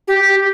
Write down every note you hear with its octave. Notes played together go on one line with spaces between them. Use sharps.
G4